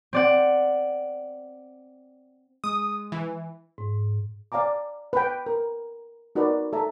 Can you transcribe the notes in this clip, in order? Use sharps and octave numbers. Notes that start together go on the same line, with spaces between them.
C4 D5 F#5
G#3 D#6
E3
G#2
D5 F5 G#5 A#5 D6
B4 G5
A#4
D#4 F#4 A#4 B4 D5 D#5
A4 E5 A#5